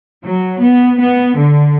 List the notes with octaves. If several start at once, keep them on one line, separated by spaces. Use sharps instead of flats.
F#3
B3
B3
D3